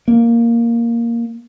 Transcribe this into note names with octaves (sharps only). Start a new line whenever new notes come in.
A#3